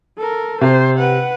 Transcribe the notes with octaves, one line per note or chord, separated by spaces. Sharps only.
A4 A#4
C3 C5
B4 F#5